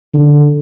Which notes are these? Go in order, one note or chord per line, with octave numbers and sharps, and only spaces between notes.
D3